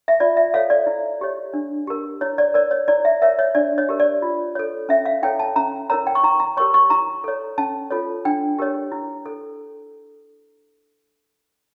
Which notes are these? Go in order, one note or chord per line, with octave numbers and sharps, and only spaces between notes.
E5
F4 D5
E5
A4 C#5 F5
D5
E4
G4 C#5
D4
G4 A#4
E4 C#5
D5
A#4 C#5 D5
C#5
E4 D5
E5
A#4 C#5 E5
C#5
D4 D5
C#5
G4 A#4
D5
F4
A4 C#5
C#4 E5
F5
E4 A4 C#5 G5
A5
C#4 A#5
E4 A#4 C#5 A#5
G5
C#6
E4 A#5
A#5
G4 A#4 C#5 C#6
C#6
E4 A#5
A4 C#5
C#4 A5
F4 A4 C#5
D4 G5
G4 A#4 C#5
E4
A4